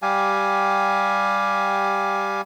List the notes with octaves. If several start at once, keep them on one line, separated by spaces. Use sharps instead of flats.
G3 G4 F5 G#5